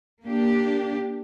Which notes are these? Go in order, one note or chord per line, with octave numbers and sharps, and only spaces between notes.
A#3 D4 G4